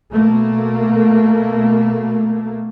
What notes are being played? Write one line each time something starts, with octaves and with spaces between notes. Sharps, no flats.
B2 A3 A#3